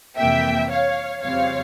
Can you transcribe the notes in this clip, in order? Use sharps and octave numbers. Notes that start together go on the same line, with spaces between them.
F2 C3 E3 A#3 E5 G5
C#5 F5
F2 C#3 G3 C4 C#5 F5